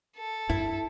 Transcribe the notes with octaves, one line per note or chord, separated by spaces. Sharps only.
A4
G2 E4